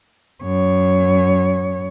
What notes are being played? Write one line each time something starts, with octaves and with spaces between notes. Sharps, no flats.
F#2 C#5